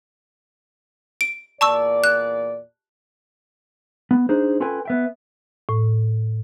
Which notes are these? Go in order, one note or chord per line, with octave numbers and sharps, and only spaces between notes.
D7
E2 A#2 D5 A5 C#6 E6
F#6
B3
D4 D#4 G#4 C5
C#4 F4 A4 B4 G5 G#5
B3 E5 G5
A2